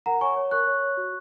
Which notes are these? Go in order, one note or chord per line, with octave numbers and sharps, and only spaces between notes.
A#4 F#5 A#5
C#5 G#5 C#6
C#5
A#4 C#6 F#6
C#5
C#5
F#4